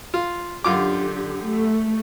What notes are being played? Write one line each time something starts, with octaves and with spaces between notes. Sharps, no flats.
F4
F#2 D3 F4 G4 D6
A3